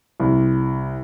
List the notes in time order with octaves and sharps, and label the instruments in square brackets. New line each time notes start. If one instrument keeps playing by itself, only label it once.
[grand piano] C2